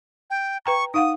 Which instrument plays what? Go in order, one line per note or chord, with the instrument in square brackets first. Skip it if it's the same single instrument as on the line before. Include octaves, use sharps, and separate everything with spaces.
[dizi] G5
[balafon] B4 G5 A#5 [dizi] C#6
[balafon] D#4 F5 F#5 [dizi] D#6